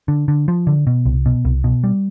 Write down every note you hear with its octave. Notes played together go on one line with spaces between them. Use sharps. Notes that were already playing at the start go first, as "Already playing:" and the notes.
D3
D3
F3
D3
B2
C2
B2
C2
B2
G3